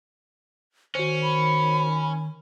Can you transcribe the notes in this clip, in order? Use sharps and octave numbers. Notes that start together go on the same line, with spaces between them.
D#3 C#4 F#4 C5
B5